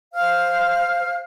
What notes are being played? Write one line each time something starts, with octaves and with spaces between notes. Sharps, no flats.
C5 F5 F6